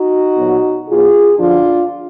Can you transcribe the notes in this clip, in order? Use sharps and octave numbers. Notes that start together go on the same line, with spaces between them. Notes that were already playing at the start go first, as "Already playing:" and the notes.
Already playing: D#4 F#4
A#2 F#3 B3
B2 F#3 B3 F4 G#4
F#2 D3 F3 D4 F4